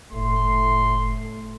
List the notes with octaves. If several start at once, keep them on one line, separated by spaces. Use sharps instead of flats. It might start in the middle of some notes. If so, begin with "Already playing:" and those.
F#1 A2 A3 C6